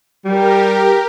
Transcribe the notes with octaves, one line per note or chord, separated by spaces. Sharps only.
G3 G4 A#4